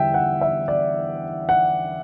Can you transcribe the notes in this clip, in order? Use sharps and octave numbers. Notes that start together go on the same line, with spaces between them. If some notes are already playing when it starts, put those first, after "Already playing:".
Already playing: E2 D3 G3 E5 G5
F#5
E5
D5
F#5